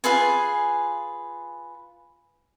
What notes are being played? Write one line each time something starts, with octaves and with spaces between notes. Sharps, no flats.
F4 G#4 B4 G#5